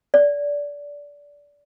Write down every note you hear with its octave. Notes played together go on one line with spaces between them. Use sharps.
D5